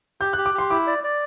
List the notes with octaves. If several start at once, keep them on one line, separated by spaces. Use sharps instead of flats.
G4 G6
F#6
G4
D6
G4 C6
E4 D6
D5
D5